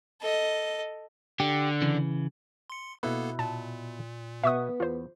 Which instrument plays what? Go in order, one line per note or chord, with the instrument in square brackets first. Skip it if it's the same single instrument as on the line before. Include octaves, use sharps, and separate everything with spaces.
[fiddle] A4 D#5
[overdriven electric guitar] D3 [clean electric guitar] G4
[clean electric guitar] C#3 E3
[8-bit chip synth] C6 C#7
[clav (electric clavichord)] B2 E4 B4 [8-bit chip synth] A#3 B3 A4
[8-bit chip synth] A#2 [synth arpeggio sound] A5
[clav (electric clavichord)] B2 F#5 [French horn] B3 [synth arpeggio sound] E5 C#6 D#6
[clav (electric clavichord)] E2 [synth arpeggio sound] F4 C5